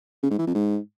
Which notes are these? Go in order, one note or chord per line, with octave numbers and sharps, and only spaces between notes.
C#3
G#2
E3
F2
G#2